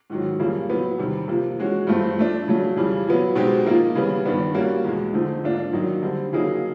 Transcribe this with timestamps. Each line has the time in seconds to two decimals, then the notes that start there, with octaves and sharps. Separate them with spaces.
0.10 G#2 D#3 F#3
0.39 F2 C#3 E3 G3 A#3
0.69 A2 F#3 B3
0.98 E2 C3 D#3 G3
1.28 C3 F3 A#3
1.58 E3 G#3 C#4 F#4
1.87 G2 E3 A3 C4 F4
2.18 F3 A3 D4
2.48 C#3 F#3 A3
2.76 F2 C#3 E3 G3
3.07 A#2 F#3 B3
3.35 B2 G#3 C4 D#4 G4
3.65 A#2 F3 A#3 D#4
3.95 C#3 E3 G3 B3
4.25 G2 D#3 G3 B3 D4
4.54 G3 A#3 C#4 F#4
4.84 E2 B2 G#3
5.13 D3 F3 A3 C4 D#4
5.43 G#2 F3 A#3 D4 F4
5.73 F#2 D#3 F#3 A#3 D#4
6.02 D3 G3 C4
6.32 C#3 F#3 A#3 D#4 G#4